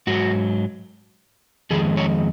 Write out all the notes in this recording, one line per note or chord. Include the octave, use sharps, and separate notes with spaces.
G#2 F#3 F#4
F2 D#3 G#3 G#4
C#5